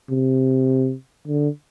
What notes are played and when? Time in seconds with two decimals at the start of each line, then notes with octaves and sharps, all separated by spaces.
0.10 C3
1.28 D3